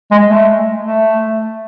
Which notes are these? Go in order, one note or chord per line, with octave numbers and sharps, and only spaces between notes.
G#3
A3
A3